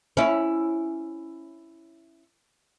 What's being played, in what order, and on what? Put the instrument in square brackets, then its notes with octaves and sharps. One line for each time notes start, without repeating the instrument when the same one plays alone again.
[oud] C#4 E4